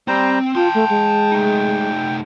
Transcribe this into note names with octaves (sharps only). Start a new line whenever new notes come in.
G3 C4 C5 A#5
F4 G5 A5 C6
A3
G#3
A3 D#4